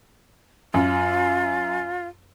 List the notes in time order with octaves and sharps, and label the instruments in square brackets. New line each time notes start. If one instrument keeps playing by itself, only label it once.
[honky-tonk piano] F#2 [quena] F4